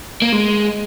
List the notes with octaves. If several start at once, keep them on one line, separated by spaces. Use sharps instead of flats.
A#3
G#3